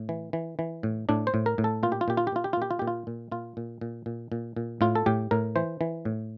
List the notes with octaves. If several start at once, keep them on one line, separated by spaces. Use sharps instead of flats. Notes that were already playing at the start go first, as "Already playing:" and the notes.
Already playing: A2
E3
E3
E3
A2
A2 D4
C5
A2
A#4
A2
A4
A#2 F4
G4
F4
A#2 G4
F4
G4
A#2 F4
G4
F4
A#2 G4
F4
A#2 G4
F4
A#2
A#2 F4
A#2
A#2
A#2
A#2
A#2
A2 F4
A4
A2 G4
A2 A#4
E3 C5
E3
A2